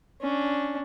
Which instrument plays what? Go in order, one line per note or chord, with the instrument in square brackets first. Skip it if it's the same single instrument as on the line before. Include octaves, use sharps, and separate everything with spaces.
[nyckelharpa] C#4 D4